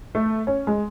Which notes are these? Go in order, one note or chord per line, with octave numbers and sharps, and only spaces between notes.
A3
C#4
G#3